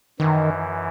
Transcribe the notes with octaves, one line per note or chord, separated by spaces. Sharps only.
F#2 D#3 E3